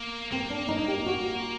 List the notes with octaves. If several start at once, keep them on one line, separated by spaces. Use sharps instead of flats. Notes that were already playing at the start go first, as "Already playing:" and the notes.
Already playing: A#3
A#3 C4
D4
D#4
G4
F#4